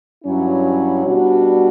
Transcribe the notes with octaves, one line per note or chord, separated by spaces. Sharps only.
G2 F#3 C#4 E4
B2 G3 D4 F#4